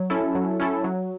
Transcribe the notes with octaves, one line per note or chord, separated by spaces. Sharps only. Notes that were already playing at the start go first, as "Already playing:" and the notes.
Already playing: F#3
C#4 E4 A4
F#3
C#4 E4 A4
F#3